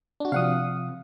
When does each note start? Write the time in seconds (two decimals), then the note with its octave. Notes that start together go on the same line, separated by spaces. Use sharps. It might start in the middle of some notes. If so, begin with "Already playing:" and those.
0.20 D4 F#4
0.32 C3 F3 F5 F#5 D#6